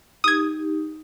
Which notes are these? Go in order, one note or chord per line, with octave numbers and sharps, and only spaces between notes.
D#4 G4 D#6 G#6